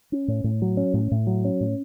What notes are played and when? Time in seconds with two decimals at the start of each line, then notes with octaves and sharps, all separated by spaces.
0.12 C#4
0.28 A2
0.44 A2
0.62 F#3
0.77 C#4
0.94 A2
1.11 A2
1.27 F#3
1.45 C#4
1.61 A2